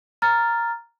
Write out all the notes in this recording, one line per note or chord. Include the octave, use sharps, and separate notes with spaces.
A#5 F6 A6